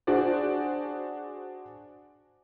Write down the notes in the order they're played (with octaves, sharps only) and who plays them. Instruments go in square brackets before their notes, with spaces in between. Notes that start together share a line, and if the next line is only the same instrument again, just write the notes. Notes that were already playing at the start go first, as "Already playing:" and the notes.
[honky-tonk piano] D4 F#4 G#4 C5 D5